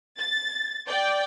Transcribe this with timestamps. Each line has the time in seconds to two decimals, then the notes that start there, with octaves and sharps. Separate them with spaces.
0.18 A6
0.87 D5 G5